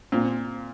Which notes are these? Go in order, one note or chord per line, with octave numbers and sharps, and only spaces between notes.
A#2 C4